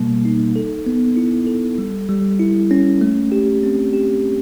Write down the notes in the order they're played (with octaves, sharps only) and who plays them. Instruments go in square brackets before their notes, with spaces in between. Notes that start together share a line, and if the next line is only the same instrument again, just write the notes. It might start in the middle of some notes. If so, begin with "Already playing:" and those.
Already playing: [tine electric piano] B2 G3 A#3
D#4
A4
B3
E4
A4
G3
G3
E4
C#4
A3
G4
C4
G4